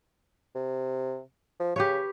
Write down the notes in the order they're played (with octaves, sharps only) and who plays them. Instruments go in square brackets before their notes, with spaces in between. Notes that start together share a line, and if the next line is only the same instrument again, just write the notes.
[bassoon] C3
F3
[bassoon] C#3 [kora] G4 B4 C#5